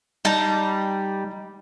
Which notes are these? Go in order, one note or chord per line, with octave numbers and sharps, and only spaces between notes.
G3 D#4 A5 A#5